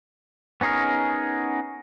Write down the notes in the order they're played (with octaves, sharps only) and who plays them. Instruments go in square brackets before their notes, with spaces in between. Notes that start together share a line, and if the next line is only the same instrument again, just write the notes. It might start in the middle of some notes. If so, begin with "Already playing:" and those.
[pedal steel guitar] B3 C#4 D#4 G#4 A#4